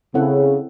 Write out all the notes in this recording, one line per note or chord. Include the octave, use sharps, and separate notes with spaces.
C#3 C4 E4 A4 C#5 F#5